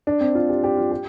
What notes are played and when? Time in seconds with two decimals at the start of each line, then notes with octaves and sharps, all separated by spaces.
0.07 D4
0.21 C4
0.35 F4
0.50 G4
0.64 G4
0.77 F4
0.92 G4